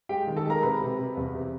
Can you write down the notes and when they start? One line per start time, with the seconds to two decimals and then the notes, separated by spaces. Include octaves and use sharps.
0.09 G#3 G4 G5
0.27 D#3
0.37 A4 A5
0.46 G#3 A#4 A#5
0.63 C3 B4 B5
0.81 C3
0.98 C3
1.17 E2
1.35 C3